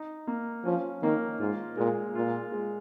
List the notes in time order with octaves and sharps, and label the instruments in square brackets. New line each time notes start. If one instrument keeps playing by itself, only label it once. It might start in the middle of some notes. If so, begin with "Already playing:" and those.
Already playing: [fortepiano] D#4
A#3
[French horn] F3 [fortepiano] C#4
[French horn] D#3 [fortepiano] A#3
[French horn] G#2 [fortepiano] F4
[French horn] A#2 [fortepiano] G#3
[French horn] A#2 [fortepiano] F4
[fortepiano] G#3